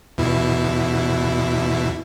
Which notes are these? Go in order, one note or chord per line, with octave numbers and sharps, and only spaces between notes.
E2 B2 E4